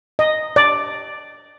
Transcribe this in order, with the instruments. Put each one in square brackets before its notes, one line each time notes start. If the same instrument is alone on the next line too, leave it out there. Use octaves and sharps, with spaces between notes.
[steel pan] D#5
D5